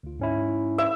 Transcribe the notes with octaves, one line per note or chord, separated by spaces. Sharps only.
D2 F4
G#2 C#4 E4
E5